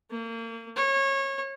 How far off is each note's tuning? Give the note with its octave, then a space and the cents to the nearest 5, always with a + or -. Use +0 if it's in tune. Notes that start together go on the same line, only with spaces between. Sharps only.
A#3 -35
C#5 -25